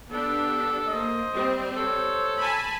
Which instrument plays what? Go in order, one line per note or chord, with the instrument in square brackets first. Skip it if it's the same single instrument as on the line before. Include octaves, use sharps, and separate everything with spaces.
[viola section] B3 D4 G4 [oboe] A4
[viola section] A#3 [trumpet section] C5 D#5
[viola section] G3 C4
[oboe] A4 [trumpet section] C5 C#5
[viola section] G#5 A5 B5